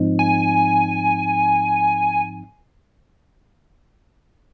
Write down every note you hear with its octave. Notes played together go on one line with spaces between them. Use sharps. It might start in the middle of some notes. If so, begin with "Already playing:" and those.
Already playing: G#2 F3 C4 D#4
G#5